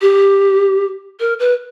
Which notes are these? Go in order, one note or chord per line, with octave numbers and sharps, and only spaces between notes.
G4
A#4
B4